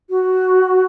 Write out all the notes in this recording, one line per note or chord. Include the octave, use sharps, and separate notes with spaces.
F#4